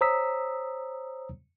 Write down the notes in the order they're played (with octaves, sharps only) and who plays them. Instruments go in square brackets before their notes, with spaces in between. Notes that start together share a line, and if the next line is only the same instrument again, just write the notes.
[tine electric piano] C5 C#5 A#5 D#6 E6 B6